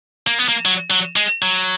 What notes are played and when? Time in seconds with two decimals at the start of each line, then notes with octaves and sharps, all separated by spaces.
0.27 A#3
0.39 B3
0.49 A#3
0.65 F#3
0.91 F#3
1.16 G#3
1.42 F#3